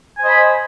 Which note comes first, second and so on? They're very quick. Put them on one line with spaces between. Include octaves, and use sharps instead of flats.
G#5 C5 D#5 B5